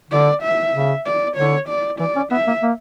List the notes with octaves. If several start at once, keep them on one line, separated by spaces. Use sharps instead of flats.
D3 D5
E5
C#3
D5
D3 C#5
D5
E3 D5
C#4
B3 E5
A#3
A#3